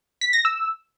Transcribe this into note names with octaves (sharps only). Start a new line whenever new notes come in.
B6
A#6
E6